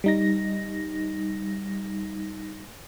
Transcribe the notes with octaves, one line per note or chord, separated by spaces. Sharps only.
G3 D#4 A#6